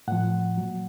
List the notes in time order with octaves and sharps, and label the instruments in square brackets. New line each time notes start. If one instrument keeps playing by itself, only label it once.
[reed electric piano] A2 F3 F#5
A#2 F#3